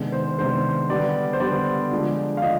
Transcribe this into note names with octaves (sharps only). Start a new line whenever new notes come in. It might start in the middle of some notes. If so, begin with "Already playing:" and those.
Already playing: C3 D#3 G#3 B3 D4
C5
C3 D#3 G#3 B3 D4 C5
D3 G3 B3 D4 D5
C5
D3 G3 B3 D4 D5
D3 F3 G#3 D4
F5
D3 F3 G#3 D#5